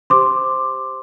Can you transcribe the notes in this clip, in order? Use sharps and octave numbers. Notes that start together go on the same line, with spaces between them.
G4 C5 C6 D6